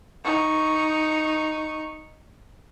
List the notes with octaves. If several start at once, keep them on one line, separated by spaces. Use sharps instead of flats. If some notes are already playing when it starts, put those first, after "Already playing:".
D#4 C#6